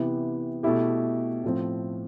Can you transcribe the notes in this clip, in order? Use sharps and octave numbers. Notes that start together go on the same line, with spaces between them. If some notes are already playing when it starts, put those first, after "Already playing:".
Already playing: C3 E3 B3 E4 G4
B2 A3 E4 G4
A2 F3 C4